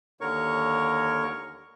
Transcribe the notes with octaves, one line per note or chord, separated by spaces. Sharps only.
D#2 D3 A#4 C#5 C#6